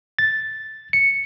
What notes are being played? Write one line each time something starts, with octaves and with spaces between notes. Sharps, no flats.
A6
C#7